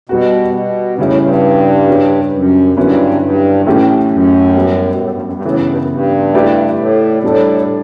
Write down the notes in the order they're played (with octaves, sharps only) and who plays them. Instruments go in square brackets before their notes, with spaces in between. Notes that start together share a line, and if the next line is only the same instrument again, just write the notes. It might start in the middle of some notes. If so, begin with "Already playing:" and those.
[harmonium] B2 [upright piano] G3 B3 F#4
[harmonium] B2
[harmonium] A2 [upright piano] C#3 G3 C#4 E4
[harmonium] G2
[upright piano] G3 D4 G4 C#5
[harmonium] F#2
[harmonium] G2 [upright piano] D3 F#3 C#4 E4 B4
[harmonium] G2
[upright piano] A2 E3 A3 C#4 G4
[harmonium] F#2
[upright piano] G3 B3 F#4
[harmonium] B2
A2
G2
F#2
G2
[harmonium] A2 [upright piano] C#3 E3 B3
[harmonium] G2
G2
F#2
G2
[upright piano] A3 E4 G4 B4 D5
[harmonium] A2
[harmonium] A2 [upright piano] G3 D4 A4 D5